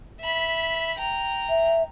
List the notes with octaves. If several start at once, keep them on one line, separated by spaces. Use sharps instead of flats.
E5 B5
G5 A#5
E5